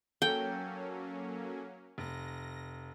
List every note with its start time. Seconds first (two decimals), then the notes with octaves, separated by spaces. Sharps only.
0.22 F#3 A#3 C#4 A4 G5
1.98 F1 A#6